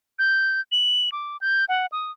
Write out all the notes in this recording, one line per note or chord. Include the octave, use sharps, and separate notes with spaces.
G6
F#7
D6
G6
F#5
D#6